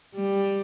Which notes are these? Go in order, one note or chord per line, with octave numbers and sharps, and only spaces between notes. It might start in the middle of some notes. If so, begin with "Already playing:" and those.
G3